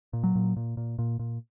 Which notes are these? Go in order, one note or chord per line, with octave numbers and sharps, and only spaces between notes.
A#2
F#3
A#2
A#2
A#2
A#2
A#2